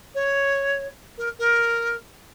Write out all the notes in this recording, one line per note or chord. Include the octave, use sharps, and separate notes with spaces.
C#5
A#4
A#4